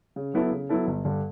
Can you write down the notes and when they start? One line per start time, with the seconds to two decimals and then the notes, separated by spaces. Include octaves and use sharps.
0.16 C#3
0.33 F#3 B3 E4 A4
0.51 C#3
0.69 F#3 B3 E4 A4
0.87 G1
1.05 G2 D3